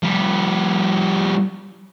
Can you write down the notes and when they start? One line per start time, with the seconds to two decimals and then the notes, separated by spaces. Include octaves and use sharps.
0.03 F3 G3